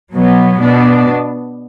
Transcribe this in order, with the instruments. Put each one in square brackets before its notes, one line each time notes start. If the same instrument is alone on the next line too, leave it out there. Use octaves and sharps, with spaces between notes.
[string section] B2 F#3 B3
B2 B3 D4